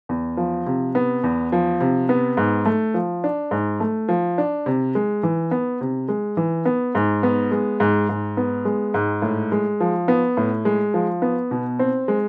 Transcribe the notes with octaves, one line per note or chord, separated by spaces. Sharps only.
E2
F3
C3
B3
E2
F3
C3
B3
G#2
A3
F3
D4
G#2
A3
F3
D4
C3
G#3
E3
B3
C3
G#3
E3
B3
G#2
B3
G#3
G#2
G#2
B3
G#3
G#2
A2
G#3
F3
B3
A2
G#3
F3
B3
B2
C4
G#3